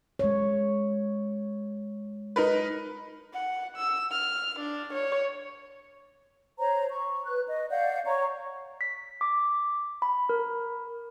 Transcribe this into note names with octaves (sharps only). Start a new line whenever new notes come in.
G#3 C#5
D#4 A#4 B4
F#5
E6
F6
D4
C#5
C5 C#5 A#5
C#6
B4 F#6
D#5
D5 F5 F#5 G6
C#5 A#5 C#6
B6
D6
B5
A#4